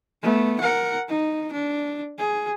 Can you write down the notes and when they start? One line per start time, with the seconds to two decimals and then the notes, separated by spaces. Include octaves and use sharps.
0.23 A3 B3
0.61 A#4 F#5
1.09 D#4
1.53 D4
2.18 G#4